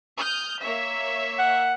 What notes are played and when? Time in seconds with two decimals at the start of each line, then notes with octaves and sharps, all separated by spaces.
0.17 D#6 F6 G6
0.61 A#3 C#5 E5
1.38 F#5